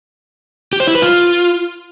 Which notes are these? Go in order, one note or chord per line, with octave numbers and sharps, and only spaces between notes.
G4
C5
E4
B4
F4